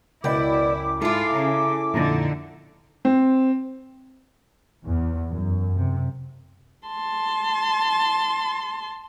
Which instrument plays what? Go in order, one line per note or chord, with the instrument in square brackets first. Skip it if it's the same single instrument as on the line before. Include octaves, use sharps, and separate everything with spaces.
[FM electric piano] C#2 G5 B5 [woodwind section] F#2 D6 [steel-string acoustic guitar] B2 D5 [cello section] E4
[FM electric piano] G#2 [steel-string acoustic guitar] E4 A4 [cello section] F4 F5 [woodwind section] E5 G#5 D6
[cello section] C#3 [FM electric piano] A#5
[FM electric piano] F2 A#2 A#5 [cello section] D3 D#4
[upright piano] C4
[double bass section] E2
F#2
C3
[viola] A5 C6